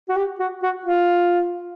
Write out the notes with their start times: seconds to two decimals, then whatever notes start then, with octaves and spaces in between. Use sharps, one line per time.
0.09 F#4
0.17 G4
0.40 F#4
0.63 F#4
0.85 F4